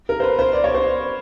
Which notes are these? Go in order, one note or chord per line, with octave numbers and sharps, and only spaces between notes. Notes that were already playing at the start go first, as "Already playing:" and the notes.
A#4
C5
B4
C5
D5
C#5
C5